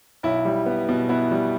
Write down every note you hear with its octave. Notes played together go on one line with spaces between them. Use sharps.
B1 E4
G3
B3
B2
B3 E4
G3